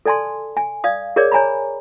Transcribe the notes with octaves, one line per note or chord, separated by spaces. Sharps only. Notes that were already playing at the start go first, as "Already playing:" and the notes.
A4 D5 G#5 A5 C6
G#5
D5 F5 D#6
G#4 A#4 C#5 D5 D6
C#5 G#5 A#5 B5